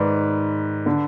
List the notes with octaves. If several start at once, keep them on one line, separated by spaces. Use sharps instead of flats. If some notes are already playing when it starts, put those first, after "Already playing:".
Already playing: G#2 D#3 B4 D5
D3